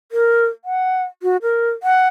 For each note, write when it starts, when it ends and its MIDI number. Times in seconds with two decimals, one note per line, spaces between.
0.12 0.46 70
0.65 1.03 78
1.23 1.37 66
1.42 1.70 70
1.83 2.08 78